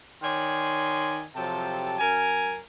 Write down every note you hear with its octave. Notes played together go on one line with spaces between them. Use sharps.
D#3 C#5 D5 G#5 C6
C3 F3 F#3 G4 A4 A5
F#2 A#4 G#5